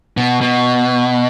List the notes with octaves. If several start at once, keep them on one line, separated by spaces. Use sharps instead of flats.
B2
B2